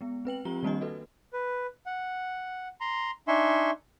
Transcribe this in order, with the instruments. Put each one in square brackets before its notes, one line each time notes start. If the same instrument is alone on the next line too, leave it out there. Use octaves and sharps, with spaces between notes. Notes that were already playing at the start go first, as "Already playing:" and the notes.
[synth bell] G#3 B3
C4 B4 G5 F#7
F3 C4 F4 G4 A#5 G7
D#3 G3 A#3 C4 D4 D#5
F#4 A4 B4
[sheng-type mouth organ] B4
F#5
A#5 C6
D4 D#4 E5 G#5 C6 C#6